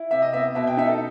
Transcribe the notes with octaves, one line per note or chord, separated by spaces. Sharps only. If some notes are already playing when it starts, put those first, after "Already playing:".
Already playing: E4
C3 E5
D#5
B3 E5
B2 E5
G5
D#4 E5
A4